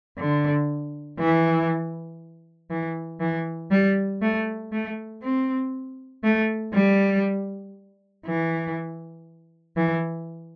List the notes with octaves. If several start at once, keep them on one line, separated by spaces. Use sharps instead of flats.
D3
E3
E3
E3
G3
A3
A3
C4
A3
G3
E3
E3